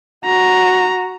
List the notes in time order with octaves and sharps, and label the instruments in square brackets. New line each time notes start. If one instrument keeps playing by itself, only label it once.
[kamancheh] F#4 [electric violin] A#5